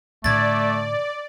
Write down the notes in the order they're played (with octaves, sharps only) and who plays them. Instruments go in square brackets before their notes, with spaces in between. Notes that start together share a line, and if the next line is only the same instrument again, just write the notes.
[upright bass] A2 D3 [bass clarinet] A3 [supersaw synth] D5 [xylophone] G#6 A6